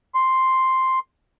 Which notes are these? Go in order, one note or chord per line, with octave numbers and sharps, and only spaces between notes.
C6